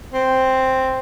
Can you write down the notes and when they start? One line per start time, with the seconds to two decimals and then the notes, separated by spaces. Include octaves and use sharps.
0.13 C4